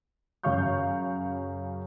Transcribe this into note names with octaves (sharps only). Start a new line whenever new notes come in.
F#2 C#3 C#5 F5 C#6 G6